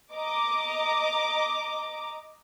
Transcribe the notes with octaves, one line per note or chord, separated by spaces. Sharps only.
D#5 A#5 D6